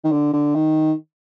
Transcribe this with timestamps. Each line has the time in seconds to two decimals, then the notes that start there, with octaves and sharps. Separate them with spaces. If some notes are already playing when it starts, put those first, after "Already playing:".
0.04 D#3
0.12 D3
0.33 D3
0.55 D#3